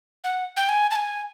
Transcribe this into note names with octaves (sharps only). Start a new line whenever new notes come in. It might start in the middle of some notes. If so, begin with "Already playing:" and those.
F#5
G5
G#5
A5
G#5